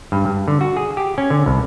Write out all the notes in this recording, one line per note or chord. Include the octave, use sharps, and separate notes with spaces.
G2
G2
D3
F#4
G#4
G4
C#4
D3
C2